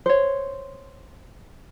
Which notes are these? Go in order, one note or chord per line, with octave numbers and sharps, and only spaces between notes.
C5 C#5